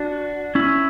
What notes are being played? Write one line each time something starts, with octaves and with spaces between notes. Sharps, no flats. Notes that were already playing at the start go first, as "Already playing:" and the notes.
Already playing: D4 F#4
C#4 E4